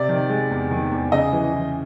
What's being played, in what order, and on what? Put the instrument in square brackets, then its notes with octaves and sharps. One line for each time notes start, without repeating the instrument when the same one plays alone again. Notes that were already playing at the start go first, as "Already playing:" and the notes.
Already playing: [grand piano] C3 [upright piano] D5
[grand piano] D#3
G#3
E2
D#3
E2
[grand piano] C#3 [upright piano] D#5
[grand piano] E3
E3